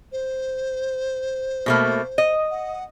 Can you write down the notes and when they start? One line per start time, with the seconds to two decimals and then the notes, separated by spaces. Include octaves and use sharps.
0.12 C5
1.66 B2 A3 A#3
2.18 D#5
2.51 F#5